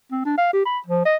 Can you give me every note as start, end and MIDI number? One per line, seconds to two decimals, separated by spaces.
0.12 0.21 60
0.25 0.34 62
0.38 0.50 77
0.53 0.62 67
0.65 0.78 83
0.86 1.05 53
1.05 1.16 75